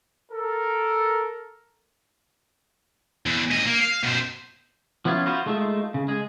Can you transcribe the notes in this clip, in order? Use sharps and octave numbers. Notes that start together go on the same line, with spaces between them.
A4 A#4
E2
D2 D#5
A#3
F5
B2 C5
F3 B3 C#4 E4 F4
F4 F#4 B4 C5
G#3 A3 D#4 F4 E5
C#3
G#3 G#4